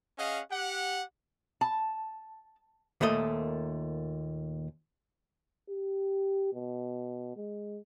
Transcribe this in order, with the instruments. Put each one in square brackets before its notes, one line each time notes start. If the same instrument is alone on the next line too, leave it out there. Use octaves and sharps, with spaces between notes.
[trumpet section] C#4 G#4 D#5 F5 F#5
G4 F#5
[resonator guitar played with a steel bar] A5
[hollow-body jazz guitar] D#2 A#2 A3 D#5
[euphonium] G4
B2
G#3